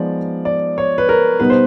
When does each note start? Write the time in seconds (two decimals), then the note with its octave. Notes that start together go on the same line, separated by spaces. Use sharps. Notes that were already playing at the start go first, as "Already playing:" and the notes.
Already playing: F3 G#3 B3 D#4 D5
0.45 D5
0.78 C#5
0.98 B4
1.09 A#4
1.40 B2 G3 B3 D#4 B4
1.50 C5